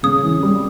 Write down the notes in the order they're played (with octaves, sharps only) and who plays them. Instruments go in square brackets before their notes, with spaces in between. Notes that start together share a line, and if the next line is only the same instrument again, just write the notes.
[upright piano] C#3 [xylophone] D#6
[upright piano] E3
G3